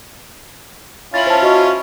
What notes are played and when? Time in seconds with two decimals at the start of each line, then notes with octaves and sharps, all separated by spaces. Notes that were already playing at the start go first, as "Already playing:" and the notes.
1.14 C#4 E4 F4 A6 F#7
1.27 C5 A5
1.43 F#4 D#5 C#6